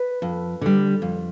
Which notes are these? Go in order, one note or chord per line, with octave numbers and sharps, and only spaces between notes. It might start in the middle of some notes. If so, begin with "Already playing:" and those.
Already playing: B4
F2
D3 G3
F2